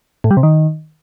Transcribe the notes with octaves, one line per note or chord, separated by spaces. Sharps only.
A2
G3
C3
D#3